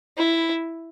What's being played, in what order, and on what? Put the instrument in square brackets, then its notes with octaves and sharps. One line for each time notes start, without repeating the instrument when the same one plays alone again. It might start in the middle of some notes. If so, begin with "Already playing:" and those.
[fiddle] E4